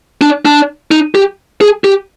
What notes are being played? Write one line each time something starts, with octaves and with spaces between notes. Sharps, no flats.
D4
D4
D#4
G4
G#4
G4